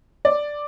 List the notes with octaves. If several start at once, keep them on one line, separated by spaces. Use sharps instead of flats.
D5